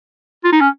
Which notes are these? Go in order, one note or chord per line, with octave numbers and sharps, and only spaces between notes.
F4
D#4
C#4